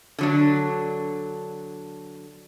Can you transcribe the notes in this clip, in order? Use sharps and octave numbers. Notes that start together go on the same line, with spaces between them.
D3 F#3 D4